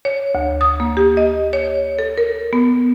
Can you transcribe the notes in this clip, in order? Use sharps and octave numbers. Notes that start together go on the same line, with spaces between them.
C#5
D2
D#6
A#3
G4
D#5
C#5
A4
A#4
B3